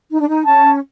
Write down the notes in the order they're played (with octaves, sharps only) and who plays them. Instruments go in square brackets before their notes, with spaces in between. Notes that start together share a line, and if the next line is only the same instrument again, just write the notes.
[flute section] D#4
D4
D#4
[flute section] C#4 [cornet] A5